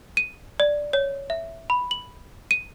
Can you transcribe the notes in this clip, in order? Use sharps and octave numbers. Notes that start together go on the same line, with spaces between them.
D#7
D5
C#5
E5
B5
F#7
D#7